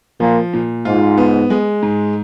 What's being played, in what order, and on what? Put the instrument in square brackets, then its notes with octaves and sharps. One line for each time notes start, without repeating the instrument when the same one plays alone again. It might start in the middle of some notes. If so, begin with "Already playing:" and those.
[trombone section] A#2 [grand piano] F3
[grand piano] A#2
[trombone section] G#2 [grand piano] F4
[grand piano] B3
G#3
G#2